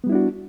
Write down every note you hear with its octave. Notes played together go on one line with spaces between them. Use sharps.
G3 B3 D4 E4 F#4